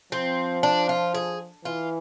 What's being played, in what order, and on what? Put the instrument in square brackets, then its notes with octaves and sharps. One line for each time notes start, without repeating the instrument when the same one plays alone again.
[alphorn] F3 [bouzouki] C4
[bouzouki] D4
F4
G#4
[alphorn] E3 [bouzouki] F4